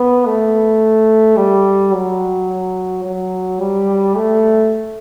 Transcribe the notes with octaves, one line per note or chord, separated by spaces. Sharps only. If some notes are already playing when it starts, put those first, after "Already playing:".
Already playing: B3
A3
G3
F#3
F#3
G3
A3